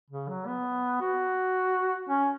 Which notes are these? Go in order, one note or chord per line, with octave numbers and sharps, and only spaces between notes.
C#3
F#3
B3
F#4
C#4